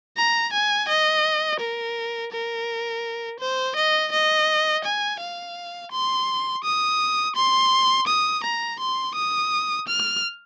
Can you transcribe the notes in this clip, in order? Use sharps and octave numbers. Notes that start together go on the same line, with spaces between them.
A#5
G#5
D#5
A#4
A#4
C5
D#5
D#5
G#5
F5
C6
D#6
C6
D#6
A#5
C6
D#6
F6